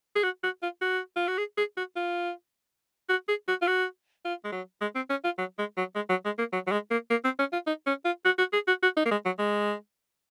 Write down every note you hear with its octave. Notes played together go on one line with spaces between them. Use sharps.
G#4
F#4
F#4
F4
F#4
F4
F#4
G#4
G#4
F#4
F4
F#4
G#4
F#4
F4
F#4
F4
G#3
F#3
G#3
C4
C#4
F4
F#3
G#3
F#3
G#3
F#3
G#3
A#3
F#3
F#3
G#3
A#3
A#3
C4
C#4
F4
D#4
C#4
F4
F#4
F#4
G#4
F#4
F#4
D#4
A#3
G#3
F#3
G#3